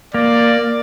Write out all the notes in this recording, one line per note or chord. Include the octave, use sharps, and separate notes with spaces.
A#3 D5